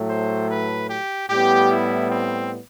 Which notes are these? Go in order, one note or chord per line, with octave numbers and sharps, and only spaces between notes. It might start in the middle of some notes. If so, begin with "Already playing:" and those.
Already playing: A2 F#3 A3
C5
B4
G4
A2 G3 B3 G4
E4
C4